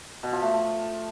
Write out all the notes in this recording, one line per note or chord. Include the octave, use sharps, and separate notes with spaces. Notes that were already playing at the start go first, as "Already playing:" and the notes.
B2
F3
A3